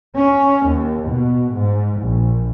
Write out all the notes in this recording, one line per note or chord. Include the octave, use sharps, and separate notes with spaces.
C#4
D#2
B2
G#2
A#1